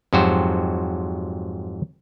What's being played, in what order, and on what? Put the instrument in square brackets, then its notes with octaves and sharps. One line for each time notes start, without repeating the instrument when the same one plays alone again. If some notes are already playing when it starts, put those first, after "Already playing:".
[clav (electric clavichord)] F2 G#2 F#3 F#4 G4 C5